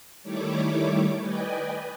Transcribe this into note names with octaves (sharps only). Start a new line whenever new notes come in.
D#3 G3 A3 E4 C#5 D6
B4 D5 D#5 G5 G#5